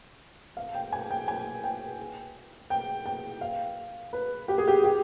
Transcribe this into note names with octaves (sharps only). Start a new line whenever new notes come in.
F5
G5
G#5
G5
G#5
G5
G5
G5
F5
B4
G4
G#4
G4
G4